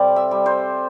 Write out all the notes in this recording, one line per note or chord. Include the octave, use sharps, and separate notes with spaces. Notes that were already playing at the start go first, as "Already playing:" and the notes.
Already playing: C3 G3 A4 C5 D5
E5
G3
C5